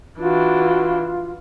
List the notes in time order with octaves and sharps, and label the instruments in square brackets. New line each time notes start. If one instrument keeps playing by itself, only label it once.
[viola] E3 D4 [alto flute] F4 [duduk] F#4